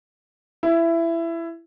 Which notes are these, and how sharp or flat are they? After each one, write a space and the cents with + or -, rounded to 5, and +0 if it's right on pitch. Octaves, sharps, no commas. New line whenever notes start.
E4 +20